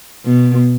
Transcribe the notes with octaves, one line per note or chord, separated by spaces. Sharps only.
B2